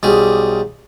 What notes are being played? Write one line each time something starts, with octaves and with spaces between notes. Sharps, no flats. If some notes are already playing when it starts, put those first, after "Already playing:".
B1 G3 G#4